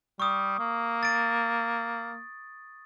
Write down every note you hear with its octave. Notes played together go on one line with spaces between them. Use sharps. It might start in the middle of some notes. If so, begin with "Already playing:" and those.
G3 C#6 D#6
A#3
A6 D7